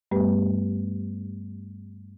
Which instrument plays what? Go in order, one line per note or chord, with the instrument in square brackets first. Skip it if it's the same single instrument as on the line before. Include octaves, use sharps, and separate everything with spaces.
[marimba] G2 G3 A3 B3 G4 B4